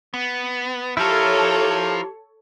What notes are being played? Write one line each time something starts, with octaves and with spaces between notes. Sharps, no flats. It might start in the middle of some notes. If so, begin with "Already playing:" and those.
B3
F3 E4 F4 G4 A4 A#4 C#5